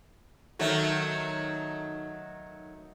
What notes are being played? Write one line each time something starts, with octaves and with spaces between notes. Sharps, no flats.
D#3 F#3 A3